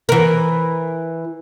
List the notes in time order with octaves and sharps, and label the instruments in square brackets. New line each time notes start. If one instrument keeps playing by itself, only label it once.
[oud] E3 A#4